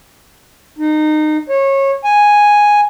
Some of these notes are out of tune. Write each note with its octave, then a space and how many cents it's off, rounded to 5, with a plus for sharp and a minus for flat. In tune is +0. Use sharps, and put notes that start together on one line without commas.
D#4 -25
C#5 -25
G#5 -5